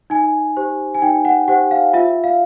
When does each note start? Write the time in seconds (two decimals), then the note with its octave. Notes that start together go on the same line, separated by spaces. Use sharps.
0.10 D#4 G#5
0.57 G4 C5
0.95 G#5
1.02 D#4 G5
1.25 F#5
1.48 G4 C5 F#5
1.71 F5
1.93 F4 E5
2.24 F5